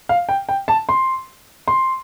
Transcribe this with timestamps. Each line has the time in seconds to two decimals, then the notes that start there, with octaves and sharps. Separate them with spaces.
0.09 F5
0.29 G5
0.49 G5
0.68 A5
0.89 C6
1.68 C6